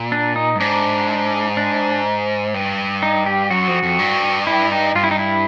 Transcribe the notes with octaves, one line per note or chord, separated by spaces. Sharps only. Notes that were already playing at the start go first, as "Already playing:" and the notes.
Already playing: A#2
D4
D#4
G2
G#2 D4
D4
G2
D#4
G4
F#2 F#4
F2
F2
G2
E4
D#4
G2 F4
E4
D#4
E4